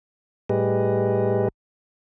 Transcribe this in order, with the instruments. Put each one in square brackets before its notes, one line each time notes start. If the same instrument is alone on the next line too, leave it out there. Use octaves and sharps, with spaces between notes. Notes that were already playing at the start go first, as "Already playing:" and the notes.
[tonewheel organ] A2 G3 G4 G#4 B4 D#5